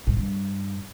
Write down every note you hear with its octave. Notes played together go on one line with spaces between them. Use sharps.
G#2
G2